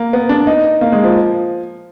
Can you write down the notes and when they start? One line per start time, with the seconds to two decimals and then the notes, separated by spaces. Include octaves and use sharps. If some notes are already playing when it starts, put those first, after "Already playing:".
Already playing: A#3
0.13 B3
0.29 D4
0.47 D#4
0.81 A#3
0.92 G#3
1.04 F3